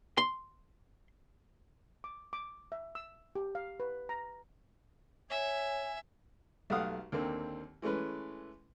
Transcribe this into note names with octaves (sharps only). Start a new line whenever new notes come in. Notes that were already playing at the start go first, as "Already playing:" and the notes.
C6
D6
D6
E5
E6
G4
F5
B4
A#5
C#5 E5 G#5
B1 A3 G4 F5 F#5 D#6
D#2 D3 A#3 C4
E3 G#3 A3 C#4 B4